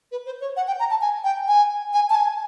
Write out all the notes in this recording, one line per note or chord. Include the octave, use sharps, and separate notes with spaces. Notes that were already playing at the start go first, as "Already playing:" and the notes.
B4
C5
C#5
F#5
G5
A#5
A5
G#5
G5
G#5
G#5
A5
G#5